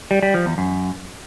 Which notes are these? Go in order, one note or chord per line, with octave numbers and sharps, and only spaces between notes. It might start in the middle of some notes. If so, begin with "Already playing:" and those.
G3
G3
F3
E2
F#2